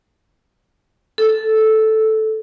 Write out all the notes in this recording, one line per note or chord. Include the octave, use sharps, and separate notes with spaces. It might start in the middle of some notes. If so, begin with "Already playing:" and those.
A4